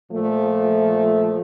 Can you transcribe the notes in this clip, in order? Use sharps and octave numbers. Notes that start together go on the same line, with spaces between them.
A#2 F3 A3